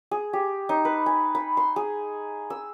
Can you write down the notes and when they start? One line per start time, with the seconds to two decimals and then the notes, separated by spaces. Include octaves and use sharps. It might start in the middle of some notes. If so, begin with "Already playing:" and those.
0.11 G#4
0.33 G4
0.69 D#4
0.85 B4
1.06 G#5
1.35 B5
1.57 C6
1.76 G#4
2.50 E6